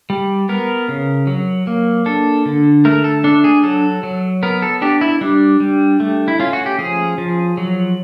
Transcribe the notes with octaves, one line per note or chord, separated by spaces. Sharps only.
G3
B3 A#4
C#3
F#3
A#3
D4 A4
D3
A3 A#4
A4
D4 A4
G#4
F#3 A4
F#3
B3 A#4
A4
D4 G4
E4
G3 D4
G3
A3
E4
C#4 F4
F#4
G4
F3 G#4
F3
F#3